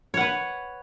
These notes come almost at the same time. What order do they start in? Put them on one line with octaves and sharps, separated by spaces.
C#5 F#5 B4